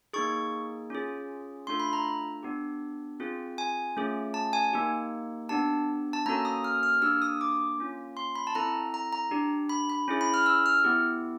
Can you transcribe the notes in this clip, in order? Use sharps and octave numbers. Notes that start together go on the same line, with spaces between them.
A#3 D#4 G#4 C#6
C#4 F4 G#4
A3 D4 F4 A4 C6
B5
A#5
B3 D4 G4
C4 F4 G#4
G#5
A3 C#4 F4 G#4
A5
G#5
A#3 D#4 G4
B3 D4 G4 A5
A5
A#3 C#4 F#4 A4 A#5
D#6
F6
F6
A#3 D4 G4 E6
D#6
D6
A#3 C#4 F4
C6
B5
A5
C4 E4 A4 A#5
A#5
A#5
D4 G4
B5
B5
C#4 E4 G#4
B5
F6
E6
F6
B3 E4 G4